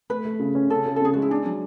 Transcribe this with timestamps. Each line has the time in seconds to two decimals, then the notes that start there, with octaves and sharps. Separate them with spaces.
0.10 A3 B4
0.25 A3
0.40 C#3
0.55 C#4
0.70 C#3 A4
0.86 C#3
0.96 A4
1.00 C#3 G#4
1.14 G#3 F#4
1.22 E4
1.30 D4 G#4
1.45 F#3 D4